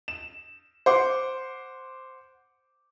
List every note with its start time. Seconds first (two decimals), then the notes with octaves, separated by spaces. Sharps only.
0.08 E7
0.86 C5 F#5 C6 D6